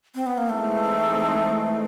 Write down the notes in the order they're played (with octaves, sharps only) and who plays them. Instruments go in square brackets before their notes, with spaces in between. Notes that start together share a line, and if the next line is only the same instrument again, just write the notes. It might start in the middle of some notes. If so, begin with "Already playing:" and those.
[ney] C4
B3
A#3
[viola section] E3 G#3 C4 D#4 [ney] A3